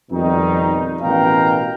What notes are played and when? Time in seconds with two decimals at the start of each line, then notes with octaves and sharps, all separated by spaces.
0.11 F2 B2 D#3 G3 D#4
1.02 A1 B2 A#4 F5 G5 A#5